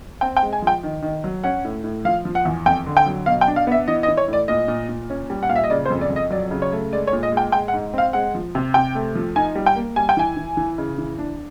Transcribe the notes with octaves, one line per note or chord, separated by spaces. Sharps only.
C4 G5
G5
G#3
G#5
F3 G5
D#3
D#3
F#3
C#4 F#5
A2
A2
F3 F5
F3
F#5
E2
F2 G5
D3
G5
F#3
B2 F5
G5
D4
F5
B3 E5
E3 D#5
D#5
E3
C#5
A2
D5
A#2 D#5
A#2
A#2
C#4
G3
F#5
A#2 F5
E5
D#5
C#3 D5
C5
F2
D5
F2
D#5
F#3 D5
C#3
C#5
A3
G#3 D5
C#5
A#2
D#5
G#3 G5
G#3 G5
F#5
G#2
C4 F5
G#3 F#5
F3
C3
C3 G5
A3
F3
D#4 G#5
G3
G5
A#3
G3 G#5
G5
E3 G#5
E3
E3
C#3
E3
D4